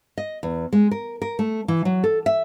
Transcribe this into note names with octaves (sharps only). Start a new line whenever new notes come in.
D#5
E2
G#3
A#4
A#4
A3
E3
F#3
A4
E5